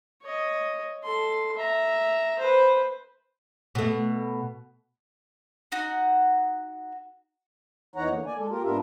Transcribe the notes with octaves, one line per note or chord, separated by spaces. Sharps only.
C#5 D#5
A4 C6
E5 A#5
B4 C5
B2 A3
D#4 F#4 F#5
E2 E3 D#4 C#5 F#5 A#5
D3 A#3
D5 G#5
G#3 A4
A#3 F4 G4 A#4
G#2 B3 D4 F4 A#4 E5